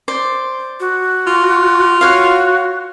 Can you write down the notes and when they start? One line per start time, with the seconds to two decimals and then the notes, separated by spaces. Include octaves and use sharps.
0.08 C5 D5
0.80 F#4
1.27 F4
2.01 F#4 C#5 F5